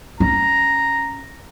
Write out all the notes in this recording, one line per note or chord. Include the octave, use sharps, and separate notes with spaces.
C#4 A#5